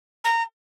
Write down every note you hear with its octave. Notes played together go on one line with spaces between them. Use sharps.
A#5